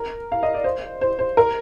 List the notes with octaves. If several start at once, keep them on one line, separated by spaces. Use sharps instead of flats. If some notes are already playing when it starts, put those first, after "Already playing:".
Already playing: A#4
F5
D#5
D5
C5
C5
C5
A#4